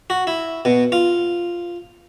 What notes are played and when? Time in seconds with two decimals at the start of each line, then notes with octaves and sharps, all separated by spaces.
0.10 F#4
0.27 E4
0.65 B2
0.92 F4